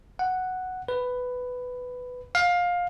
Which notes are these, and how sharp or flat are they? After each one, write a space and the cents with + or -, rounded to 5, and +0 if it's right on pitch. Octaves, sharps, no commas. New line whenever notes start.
F#5 +0
B4 +10
F5 +20